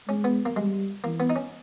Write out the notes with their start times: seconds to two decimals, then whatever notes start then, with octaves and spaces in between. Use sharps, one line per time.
0.08 G#3 C#4
0.24 B3
0.46 A#3
0.56 G3 G#3
1.04 E3 A#3
1.20 B3
1.30 D#4
1.36 C#4